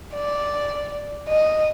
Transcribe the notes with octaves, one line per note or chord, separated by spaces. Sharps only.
D5
D#5